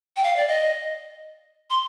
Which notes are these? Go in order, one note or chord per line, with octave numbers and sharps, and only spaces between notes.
G5
F5
D5
D#5
C6